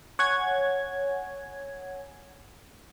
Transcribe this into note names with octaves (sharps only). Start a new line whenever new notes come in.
C#5 F#5 G#5 G#6